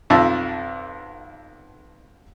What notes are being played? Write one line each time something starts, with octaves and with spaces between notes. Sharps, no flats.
B1 F2 E5 A5